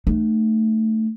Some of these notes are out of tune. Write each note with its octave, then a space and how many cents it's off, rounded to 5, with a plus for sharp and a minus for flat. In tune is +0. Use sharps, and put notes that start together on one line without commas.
A3 +0 D#4 -35